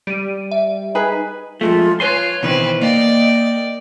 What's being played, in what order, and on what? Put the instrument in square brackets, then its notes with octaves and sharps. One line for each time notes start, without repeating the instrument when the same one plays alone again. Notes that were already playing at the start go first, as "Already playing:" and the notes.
[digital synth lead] G3 [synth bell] D7 D#7
[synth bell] E5
[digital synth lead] D#4 [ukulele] G#4 B4 G#5
[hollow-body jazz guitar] F2 G#3 A3 [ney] F4
[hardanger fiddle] F4 [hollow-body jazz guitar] B4 G#5 C6 [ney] C#5
[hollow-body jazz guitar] B2 D#3 E3 [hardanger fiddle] C4 B4
[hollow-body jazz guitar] A#3 [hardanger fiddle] D5 G5 [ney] D#5